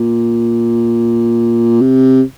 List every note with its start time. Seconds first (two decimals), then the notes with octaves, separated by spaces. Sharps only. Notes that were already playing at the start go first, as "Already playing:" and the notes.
Already playing: A#2
1.81 C3